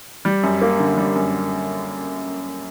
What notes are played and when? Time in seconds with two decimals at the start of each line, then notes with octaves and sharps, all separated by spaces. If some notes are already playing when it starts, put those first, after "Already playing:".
0.25 G3
0.43 F#2
0.62 A#3
0.80 D3
0.97 G3
1.15 F#2